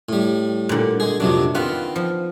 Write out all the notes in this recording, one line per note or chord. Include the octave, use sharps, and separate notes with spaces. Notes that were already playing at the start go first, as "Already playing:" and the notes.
A2 G3
A#2 D3
G#3 G#4
F2 C3 F#3 D4
D#3 B3 C4 F4 B4
F3